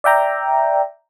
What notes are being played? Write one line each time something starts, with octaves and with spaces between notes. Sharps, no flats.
D5 E5 G5 A#5